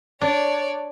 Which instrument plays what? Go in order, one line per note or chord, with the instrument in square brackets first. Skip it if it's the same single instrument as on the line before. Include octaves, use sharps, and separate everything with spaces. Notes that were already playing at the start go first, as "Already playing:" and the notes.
[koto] D4 [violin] C#5 D5